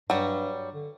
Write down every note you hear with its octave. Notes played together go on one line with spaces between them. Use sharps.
G2 F#3 G3
D3